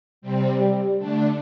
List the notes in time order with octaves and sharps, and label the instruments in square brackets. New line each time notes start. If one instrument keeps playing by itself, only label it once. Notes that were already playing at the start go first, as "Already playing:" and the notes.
[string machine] C3 G3 C4
[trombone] G3
[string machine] D3 A3 D4